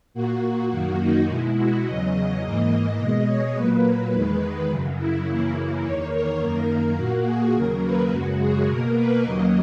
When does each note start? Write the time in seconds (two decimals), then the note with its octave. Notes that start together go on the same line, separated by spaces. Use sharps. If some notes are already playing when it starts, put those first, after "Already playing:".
0.14 A#2 A#3 F#4
0.71 F#2 D#3 A#3
1.00 D#4
1.28 B2 G#3 E4
1.57 F#4
1.84 E2 C#3 F#3 D#5
2.13 D#5
2.41 G#2 E3 A#3
2.98 B2 G#3
3.27 C#5
3.55 A#2 F#3 A#3 B4
4.12 E2 D#3 G#3
4.69 F#2 C#3 F#3
4.98 E4
5.26 F#2 C#3 E3 A#3
5.55 E4
5.83 E2 D#3 A#3 C#5
6.12 A#4
6.40 F#2 D#3 A#3 A#4
6.97 A#2 A#3 F#4
7.26 G#4
7.54 D#2 C#3 F#3 A#3 A#4
7.82 B4
8.10 F#2 C#3 G#3 F#4
8.40 G#4
8.68 B2 A#3 A#4
8.96 B4
9.24 D#2 C#3 F#3 A#3 D#5